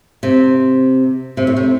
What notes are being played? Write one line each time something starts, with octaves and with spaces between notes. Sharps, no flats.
C3
C3
A2
C3